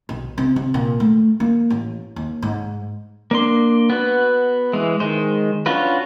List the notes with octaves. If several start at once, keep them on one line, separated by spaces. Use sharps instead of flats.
B1
C3
C3
A#2
A3
A#3
A1
D#2
G#2
A#3 D4 C6
B3 F#4 B4
E3 G#3
D#3 G#3 C5
C#4 D4 F4 F#4 B4